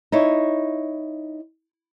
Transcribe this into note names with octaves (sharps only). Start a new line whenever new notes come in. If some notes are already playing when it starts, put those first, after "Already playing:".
D#4 E4 C#5